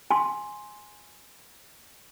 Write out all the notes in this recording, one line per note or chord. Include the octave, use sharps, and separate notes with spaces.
G#5 C6